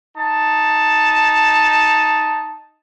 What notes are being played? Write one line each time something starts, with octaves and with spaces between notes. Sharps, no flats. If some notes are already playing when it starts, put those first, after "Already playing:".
D#4 A5